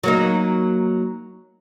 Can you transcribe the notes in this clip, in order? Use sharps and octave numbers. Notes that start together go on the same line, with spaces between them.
F#3 A#3 D#4